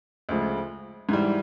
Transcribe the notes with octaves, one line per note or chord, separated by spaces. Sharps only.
D2 C#3 F3 G#3
G#2 E3 G3